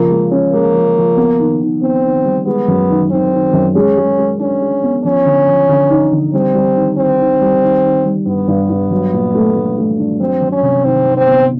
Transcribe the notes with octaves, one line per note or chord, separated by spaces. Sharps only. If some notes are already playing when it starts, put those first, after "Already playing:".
Already playing: C#3 F3 A#3
G#3
C#4
G#3 A#3
F3
F3
B3
D#3
D#3
B3 C4
D#3
G3
G#3 B3
F#2
D#3
D#3 C4
D#3
F#2
G#3 C#4
G#3
G#3
C#4 D4
G#3
B3
F3 C#4
D3
F3
D3
D#4
D3
G3 C4
G3
D#3
D#3 C4
D#3
G3
D#3
D#3
G3
G2 B3
G2
G2
F#3
A#2
A3
A3
A3
D4
F#3 C4
F#3
C#4
C3
D#3 C4
D#3
C4
B3